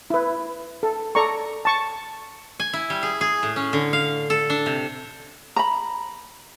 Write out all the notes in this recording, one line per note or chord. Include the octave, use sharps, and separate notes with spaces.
E4 B4
A4
A4 D5 A#5 C#6
A5 C#6
G#5
E4
G3
G#4
G#4
A2
C#4
D3
F5
A4
D4
C3
A#5 B5